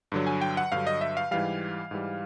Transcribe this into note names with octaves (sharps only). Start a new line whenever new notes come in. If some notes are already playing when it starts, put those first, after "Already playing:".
G2 D3 F#3
G#5
G5
F#5
G2 D3 F#3 F5
D#5
E5
F5
G#2 E3 G3 F5
G#2 E3 G3